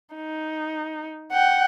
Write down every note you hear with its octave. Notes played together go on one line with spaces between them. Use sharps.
D#4
F#5 G5